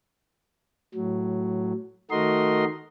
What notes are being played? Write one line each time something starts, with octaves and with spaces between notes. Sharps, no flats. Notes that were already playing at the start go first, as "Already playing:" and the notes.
A2 F#3
D#3 A3 F#4 A#4 D#5 C6